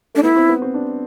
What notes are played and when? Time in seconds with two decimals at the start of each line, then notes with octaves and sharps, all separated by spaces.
0.15 A3 D4
0.23 B3 E4
0.36 C4
0.49 B3
0.62 C4
0.74 D4